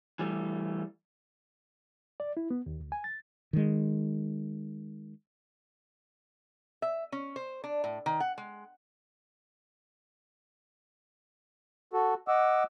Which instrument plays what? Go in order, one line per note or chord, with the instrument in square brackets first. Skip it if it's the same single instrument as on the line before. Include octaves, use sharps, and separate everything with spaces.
[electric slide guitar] E3 G3 A3
[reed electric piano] D5
E4
B3
D#2
D2
G#5
A6
[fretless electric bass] D#3 G#3
[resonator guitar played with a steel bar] E5
C#4
C5
D4
A2
D#3
F#5
G#3
[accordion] F#4 A4
D#5 F#5 D6 E6